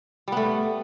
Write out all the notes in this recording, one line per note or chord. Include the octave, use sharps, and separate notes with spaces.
G3 A3 B3